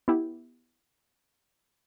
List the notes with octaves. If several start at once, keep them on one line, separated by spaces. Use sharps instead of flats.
B3 E4 G4